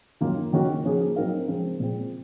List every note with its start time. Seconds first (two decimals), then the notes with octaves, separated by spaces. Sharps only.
0.21 F#2 D#3 A#3 C#4 F4
0.53 D#3 A#3 C#4 F#4
0.84 F3 A#3 C#4 G#4
1.16 F#3 C4 D#4 A#4 F5
1.48 C#3 F3 G#3 C4
1.80 A#2 G#3 C4